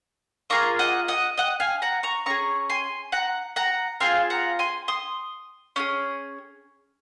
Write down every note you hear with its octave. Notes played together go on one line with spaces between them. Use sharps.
A#3 F4 G#4 A#5 C#6
D#5 F#5
D#5 F#5
D#5 F#5
F5 G#5
F#5 A#5
A#5 C#6
C#4 G#4 A#5 C#6
G#5 C6
F#5 A#5
F#5 A#5
C4 F4 G#4 F5 G#5
F#5 A#5
G#5 C6
C6 D#6
C#4 F4 G#4